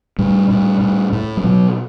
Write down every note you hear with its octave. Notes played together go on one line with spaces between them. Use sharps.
A2 G3
A2
A2
A2
G3
B2 F#3